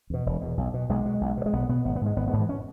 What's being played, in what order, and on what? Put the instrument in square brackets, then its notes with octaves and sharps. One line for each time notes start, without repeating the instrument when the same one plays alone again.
[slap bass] E2 B2
E1
E2 B2
B1
B2
B1 G#3
B2
B1
B2
G#3
B1 B3
B2 B3
G#1 B3
B3
G#2 G#3
G#1 B3
B3
G#2
E3
C#4